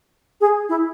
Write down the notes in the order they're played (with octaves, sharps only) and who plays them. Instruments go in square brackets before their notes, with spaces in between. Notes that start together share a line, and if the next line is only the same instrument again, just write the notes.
[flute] G#4
E4